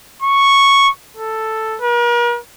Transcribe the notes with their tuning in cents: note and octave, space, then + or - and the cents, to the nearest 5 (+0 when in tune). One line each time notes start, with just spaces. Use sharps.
C#6 -5
A4 +5
A#4 +45